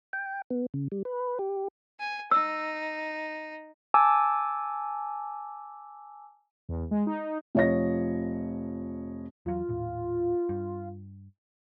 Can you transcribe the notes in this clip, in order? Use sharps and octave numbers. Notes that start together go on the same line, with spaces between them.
G5
B3
C#3
G3
B4
G4
G#5
D#4 E6
G#5 A5 D6 E6
E2
G#3
D#4
F1 F3 C#5 D#5 A#6
E2 F#3 F4
D#1 A2
G2